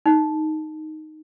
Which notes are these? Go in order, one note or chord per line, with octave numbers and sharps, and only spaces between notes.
D#4